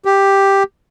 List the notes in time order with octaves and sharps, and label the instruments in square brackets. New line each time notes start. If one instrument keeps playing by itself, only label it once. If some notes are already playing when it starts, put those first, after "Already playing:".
[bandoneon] G4